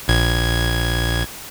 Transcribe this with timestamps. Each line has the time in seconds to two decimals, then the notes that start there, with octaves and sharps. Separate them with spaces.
0.08 A#1 G#6